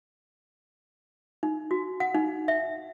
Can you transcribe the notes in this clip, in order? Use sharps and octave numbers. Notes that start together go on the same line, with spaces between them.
D#4
F#4
F#5
D#4
E5